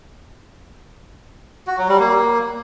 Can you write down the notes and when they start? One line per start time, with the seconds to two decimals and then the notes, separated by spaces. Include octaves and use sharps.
1.67 F#4
1.78 F#3
1.89 G3
2.00 A#3